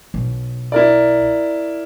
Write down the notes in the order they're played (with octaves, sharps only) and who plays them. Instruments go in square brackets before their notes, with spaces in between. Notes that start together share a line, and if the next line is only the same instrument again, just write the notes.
[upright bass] B1
[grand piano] E4 A#4 D5